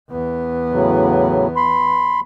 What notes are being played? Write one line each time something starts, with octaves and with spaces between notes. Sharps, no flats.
E2 B3
A2 C#3 F#3
B5 C6